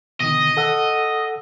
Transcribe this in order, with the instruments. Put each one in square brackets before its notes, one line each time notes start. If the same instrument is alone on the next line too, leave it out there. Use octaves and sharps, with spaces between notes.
[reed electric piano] B2 D3 D#3 [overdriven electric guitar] D#5
[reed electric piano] A4 F#5 E6